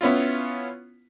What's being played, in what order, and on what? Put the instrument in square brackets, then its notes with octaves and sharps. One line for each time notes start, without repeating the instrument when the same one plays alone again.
[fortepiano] B3 C#4 E4 F4